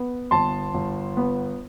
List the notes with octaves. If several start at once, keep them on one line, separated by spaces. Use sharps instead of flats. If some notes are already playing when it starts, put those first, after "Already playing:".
Already playing: B3
G1 A5 C6
G1
B3